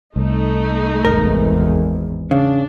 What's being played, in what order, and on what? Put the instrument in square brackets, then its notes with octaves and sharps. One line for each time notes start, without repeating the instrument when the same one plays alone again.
[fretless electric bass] C2 [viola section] A3 D#4
[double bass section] G#1 E2 [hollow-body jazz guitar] A#4
[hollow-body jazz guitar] C#3 [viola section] D4